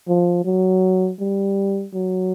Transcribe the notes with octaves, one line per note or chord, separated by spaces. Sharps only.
F3
F#3
G3
F#3